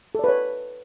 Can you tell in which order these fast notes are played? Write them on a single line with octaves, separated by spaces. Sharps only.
A4 D5 B4 C#5